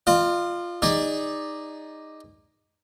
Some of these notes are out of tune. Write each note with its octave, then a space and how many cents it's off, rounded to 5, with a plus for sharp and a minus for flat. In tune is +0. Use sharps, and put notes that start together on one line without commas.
F4 +0 D#5 -45
D#4 +0 G#4 -30 D5 +5